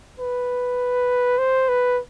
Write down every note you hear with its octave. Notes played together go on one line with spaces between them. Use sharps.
B4
C5
B4